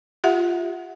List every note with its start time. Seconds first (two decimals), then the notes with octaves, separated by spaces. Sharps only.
0.24 F4 G4 E5 F#5